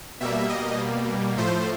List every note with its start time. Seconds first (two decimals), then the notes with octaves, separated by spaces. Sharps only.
0.20 B2 G3 A#3 E5
0.49 D#5
1.38 A2 F3 A3 C5